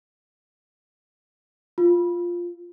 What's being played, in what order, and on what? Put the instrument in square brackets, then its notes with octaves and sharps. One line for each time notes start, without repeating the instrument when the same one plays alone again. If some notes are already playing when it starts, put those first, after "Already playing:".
[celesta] F4